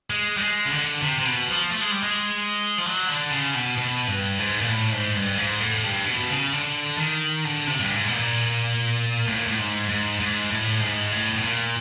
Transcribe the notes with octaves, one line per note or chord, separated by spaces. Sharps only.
G#3
G3
G#3
C#3
D3
C3
C3
B2
F3
A3
G#3
G3
G#3
F3
F#3
D3
C#3
B2
B2
G2
G#2
A#2
A2
G#2
G2
G#2
A2
G2
B2
C#3
D3
D#3
D3
C3
G2
G#2
B2
A#2
A2
A#2
A2
G#2
G#2
G#2
A2
G#2
A2
B2
A#2